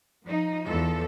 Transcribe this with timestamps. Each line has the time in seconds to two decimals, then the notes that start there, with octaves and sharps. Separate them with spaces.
0.24 F3 D#4
0.66 E2 F3 A4